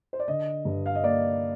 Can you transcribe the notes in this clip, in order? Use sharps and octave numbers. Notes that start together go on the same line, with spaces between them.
C5
D5
D3 D#5
G2
F5
D#5
A#3 D5